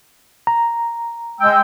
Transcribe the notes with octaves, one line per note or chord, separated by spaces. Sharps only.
A#5
G#3 G5 E6